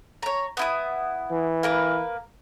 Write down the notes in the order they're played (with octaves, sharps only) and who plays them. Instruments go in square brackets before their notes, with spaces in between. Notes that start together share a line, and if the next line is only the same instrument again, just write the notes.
[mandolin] C#5 A#5
B3 E4 D#6
[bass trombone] E3
[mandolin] A#3 A#4 B4